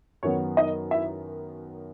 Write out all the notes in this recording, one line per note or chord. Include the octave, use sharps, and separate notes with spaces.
F#2 D#3 F#3 B3 C#5
D#4 D#5
E4 E5